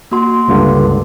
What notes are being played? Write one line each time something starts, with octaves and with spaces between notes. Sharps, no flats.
A#3 F#4 C6
C#2 G2 D3